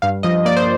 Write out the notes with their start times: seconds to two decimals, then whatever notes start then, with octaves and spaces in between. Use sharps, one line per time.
0.02 G2 F5
0.23 F3 D#5
0.45 A#3 D5
0.57 C5